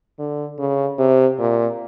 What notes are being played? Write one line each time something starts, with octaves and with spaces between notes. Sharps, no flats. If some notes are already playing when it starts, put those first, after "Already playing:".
D3
C#3
C3
A#2